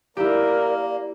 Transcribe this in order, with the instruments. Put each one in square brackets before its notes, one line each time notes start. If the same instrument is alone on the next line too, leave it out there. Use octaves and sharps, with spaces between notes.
[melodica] A#3 [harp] E4 G4 [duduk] A#4 [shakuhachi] D5